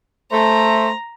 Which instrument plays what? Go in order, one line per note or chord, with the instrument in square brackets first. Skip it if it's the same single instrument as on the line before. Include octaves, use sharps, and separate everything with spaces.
[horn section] A3 [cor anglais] C5 [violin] A#5